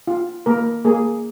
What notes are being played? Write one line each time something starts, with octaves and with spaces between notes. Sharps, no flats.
F4
A#3 A#4
A#3 G#4